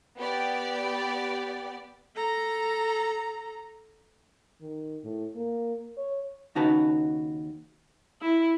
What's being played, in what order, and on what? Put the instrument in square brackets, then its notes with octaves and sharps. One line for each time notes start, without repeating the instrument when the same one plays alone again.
[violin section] B3 G4 D5
[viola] A4 A#5
[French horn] D#3
A2
A#3
C#5
[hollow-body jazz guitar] D#2 C#3 D#4 F#4 B4 A5
[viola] E4